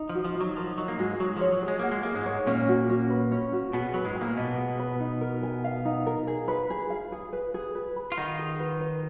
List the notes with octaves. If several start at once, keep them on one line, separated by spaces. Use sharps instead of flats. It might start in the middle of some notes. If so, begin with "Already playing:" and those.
Already playing: D#4
F3
F#4
F3
D#4
F#3
F3 A#4
F#3 D#4
A#3
G#2 G#3 F#4
F#3 G#4
F3 C#5
F#3
G#4
G#3
A#3 F#5
G#3
A#3 G#4
G#2 G#3
C#5
A#2 A#3 C#4
F#4
C#4
B4
C#4
F#4
B2 B3 G#4
F#3 B4
G#2 G#3
G#5
A#2 A#3
B2 B3 D#5
G#4
B4
D#4
A#4
G#5
F5
D#4
A#4
G#4
B4
G#4
F5
G#4
B4
G#4
B4
B5
F4
D#3 D#4 F#5
G#4
B4
B4